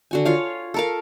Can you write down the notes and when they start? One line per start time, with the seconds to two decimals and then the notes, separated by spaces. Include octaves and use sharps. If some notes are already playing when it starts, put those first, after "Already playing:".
0.11 D3 F#4 G#5
0.25 F4 C#5 F5
0.74 A4 A#4 F5